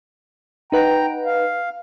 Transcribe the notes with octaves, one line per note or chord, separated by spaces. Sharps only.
D#4 B4 F#5 G5 A#5
F5